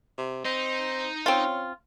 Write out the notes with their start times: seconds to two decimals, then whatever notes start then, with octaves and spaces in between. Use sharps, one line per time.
0.18 C3
0.45 C4 D#4
1.26 C4 C#4 F4